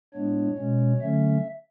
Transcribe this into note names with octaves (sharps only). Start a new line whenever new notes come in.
A2 G#3 B3 D4 C#5
B2 G#3 C#4
D3 F#3 A3 C#4 E5